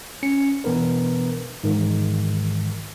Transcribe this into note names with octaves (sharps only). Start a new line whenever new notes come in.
C#4 C#7
B2 E3 B3 D4 A#4 B4
G#2 D#3 E3